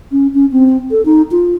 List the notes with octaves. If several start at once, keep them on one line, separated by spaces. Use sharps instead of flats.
C#4
C#4
C4
A4
D#4
F4